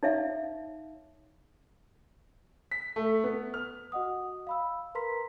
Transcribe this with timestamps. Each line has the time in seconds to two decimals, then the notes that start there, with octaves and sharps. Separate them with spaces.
0.03 D#4 C#5 E5 F5
2.71 B6
2.96 A3
3.24 B3
3.54 F6
3.92 F#4 D#5 F#5 D#6
4.47 F5 B5 E6
4.95 A#4 B4 A#5 C6 B6